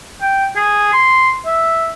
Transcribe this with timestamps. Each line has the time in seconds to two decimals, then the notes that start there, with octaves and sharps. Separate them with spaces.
0.21 G5
0.56 G#4
0.93 C6
1.46 E5